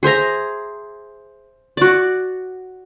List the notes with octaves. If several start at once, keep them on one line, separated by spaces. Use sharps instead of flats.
G#4 C5 E5 A#5
F#4 D5